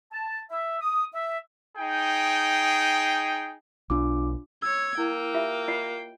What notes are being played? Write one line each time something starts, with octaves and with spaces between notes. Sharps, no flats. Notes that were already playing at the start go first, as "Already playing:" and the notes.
A5
E5
D#6
E5
D#4 G#4 G5
B1 D4 F4 D6
C#5 E6 G#6
A#3 E4 G5
F4 G4 E5
F4 C#5 D#5 C7